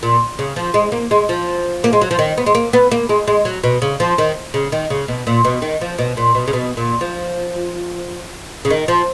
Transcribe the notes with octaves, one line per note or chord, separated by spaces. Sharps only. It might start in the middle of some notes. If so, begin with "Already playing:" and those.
A#2
C#3
F3
G#3
A#3
G#3
F3
A#3
G#3
F#3
F3
D#3
B3
G#3
A#3
B3
A#3
G#3
G#3
F#3
B2
C#3
F3
D#3
C#3
D#3
C#3
B2
A#2
B2
D#3
F3
B2
A#2
B2
C#3
B2
A#2
F3
C#3
D#3
F3